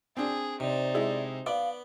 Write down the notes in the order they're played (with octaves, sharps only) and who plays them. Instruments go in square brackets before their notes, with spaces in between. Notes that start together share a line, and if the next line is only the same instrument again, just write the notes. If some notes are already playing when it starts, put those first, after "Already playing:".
[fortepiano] C4 D4 [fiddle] G#4
[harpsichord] C3 [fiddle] D#4 C5 [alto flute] D5
[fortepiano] G#3 E4 G#4
[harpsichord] B3 [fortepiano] D5 [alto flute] F5